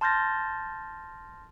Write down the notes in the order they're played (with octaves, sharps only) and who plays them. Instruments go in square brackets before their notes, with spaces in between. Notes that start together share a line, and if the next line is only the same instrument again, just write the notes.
[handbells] A5 C6 F6 G6 A6 A#6